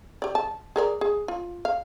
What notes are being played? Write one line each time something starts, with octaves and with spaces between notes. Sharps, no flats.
G4 D5
A5
G#4 A#4 D5
G#4
F4
F5